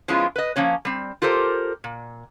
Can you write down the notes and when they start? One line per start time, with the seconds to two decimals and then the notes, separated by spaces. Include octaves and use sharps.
0.08 F3 G#3 B3 C#4 E4 F4
0.36 B4 D#5
0.56 F3 A#3 C#4 C#5
0.85 G3 C4
1.22 F4 G4 A4 A#4 C5
1.84 A#2